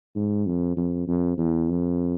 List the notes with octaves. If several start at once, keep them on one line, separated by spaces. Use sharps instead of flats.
G#2
F2
F2
F2
E2
F2